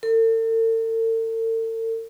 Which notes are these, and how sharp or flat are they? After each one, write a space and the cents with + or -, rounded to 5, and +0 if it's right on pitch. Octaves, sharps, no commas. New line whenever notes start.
A4 +45